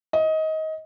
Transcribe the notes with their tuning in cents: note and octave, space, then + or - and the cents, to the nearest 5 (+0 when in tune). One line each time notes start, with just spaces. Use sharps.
D#5 +20